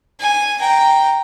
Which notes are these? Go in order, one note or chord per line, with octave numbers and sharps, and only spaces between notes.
G#5
G5 A#5